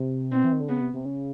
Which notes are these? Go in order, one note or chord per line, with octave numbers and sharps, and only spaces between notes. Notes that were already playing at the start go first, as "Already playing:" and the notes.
Already playing: C3
B2 C4
E3
D#3
D3
C#3 B3
C3
C3
C#3